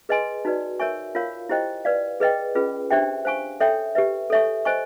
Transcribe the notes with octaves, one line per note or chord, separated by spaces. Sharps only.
G#4 B4 D#5 G#5 C6
D#4 F#4 B4 D5
A#4 C#5 E5 G#5 C#6
F4 A#4 C#5 F5
E4 G4 C5 D#5 G5
B4 D5 F5
G#4 B4 D#5 G5
C#4 F4 G#4 B4
D4 G4 C5 E5 G5
C5 F5 G#5 C#6
A4 C#5 E5 G5
G4 B4 E5
A4 C#5 E5 G#5 C#6
C5 D#5 G#5 C#6